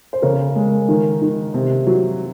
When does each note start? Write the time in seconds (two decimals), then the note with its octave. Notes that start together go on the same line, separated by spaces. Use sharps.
0.13 C5
0.22 C#3 A#4 C#5
0.56 G#3
0.89 D#3
1.22 D#3
1.54 C3
1.87 F#3